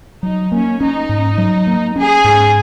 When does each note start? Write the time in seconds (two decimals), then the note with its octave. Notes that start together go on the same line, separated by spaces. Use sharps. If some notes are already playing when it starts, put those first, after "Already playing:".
0.23 F#3 D#4
0.52 A#3 C#4
0.80 C#4 D#4
1.09 G#2
1.38 F#3
1.67 A#3
1.96 C#4 G#4
2.24 G#2